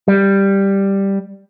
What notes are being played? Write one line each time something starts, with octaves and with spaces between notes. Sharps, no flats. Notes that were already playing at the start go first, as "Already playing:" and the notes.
G3